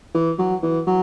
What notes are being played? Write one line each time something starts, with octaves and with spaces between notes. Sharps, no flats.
E3
F#3
E3
F#3